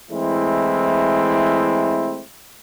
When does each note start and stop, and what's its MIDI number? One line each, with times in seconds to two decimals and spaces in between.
0.11 2.22 52
0.11 2.22 56
0.11 2.22 57
0.11 2.22 60
0.11 2.22 64